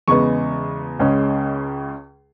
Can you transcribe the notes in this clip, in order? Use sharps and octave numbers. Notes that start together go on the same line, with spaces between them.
E2 C#3 G#3 B3 C#6
C#2 C#3 G#3 C#4